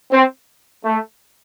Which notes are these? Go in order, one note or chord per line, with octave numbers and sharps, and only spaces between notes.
C4
A3